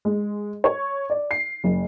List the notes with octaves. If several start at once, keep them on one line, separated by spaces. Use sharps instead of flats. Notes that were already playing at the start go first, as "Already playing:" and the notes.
G#3
C#5
D5
C7
F#1